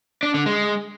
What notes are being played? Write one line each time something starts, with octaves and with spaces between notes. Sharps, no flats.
D4
D3
G#3